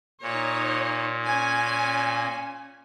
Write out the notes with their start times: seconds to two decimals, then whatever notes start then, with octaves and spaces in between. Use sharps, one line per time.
0.22 A#2 D#4 C#5
1.26 C#4 G#5